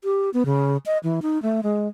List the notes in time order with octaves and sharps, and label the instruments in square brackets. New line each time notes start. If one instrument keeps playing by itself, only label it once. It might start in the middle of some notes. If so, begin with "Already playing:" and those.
[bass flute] G4
B3
C#3
D#5
E3
D#4
A3
G#3